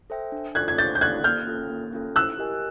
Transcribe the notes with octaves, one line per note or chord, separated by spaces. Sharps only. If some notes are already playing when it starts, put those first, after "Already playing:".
A4 C5 E5 G5
D4
F4 A4 D5 F#6 G#6
G#6
D4 G6 A6
G6
F4 A4 D5 F#6 G#6
A#3 F6 G6
C#4 F4 A4
A#3
C#4 F4 A4
E4 E6 F#6
G4 A#4 D#5 G#5